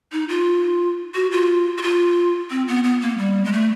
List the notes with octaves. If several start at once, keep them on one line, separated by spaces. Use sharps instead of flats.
D#4
F4
F#4
F4
F#4
F4
C4
B3
B3
A#3
G3
G#3
A3